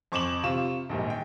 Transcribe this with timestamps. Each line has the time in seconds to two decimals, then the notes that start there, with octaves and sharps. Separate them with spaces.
0.12 F2 C#6 D6 E7 F#7
0.43 C3 F4 C#6 E7
0.89 A#1 D#2 G#2
1.10 G5